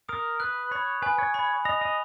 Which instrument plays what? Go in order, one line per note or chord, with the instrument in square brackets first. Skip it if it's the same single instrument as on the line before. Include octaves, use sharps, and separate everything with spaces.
[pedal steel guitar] A#4 [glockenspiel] D#6
[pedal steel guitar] B4 [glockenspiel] F#6
[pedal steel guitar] C#5 [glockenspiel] B5
[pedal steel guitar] B4 [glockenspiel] G#5
[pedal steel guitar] C#5
[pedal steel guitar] C#5 [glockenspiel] B5
[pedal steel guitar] D#5 [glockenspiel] F7
[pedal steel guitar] D#5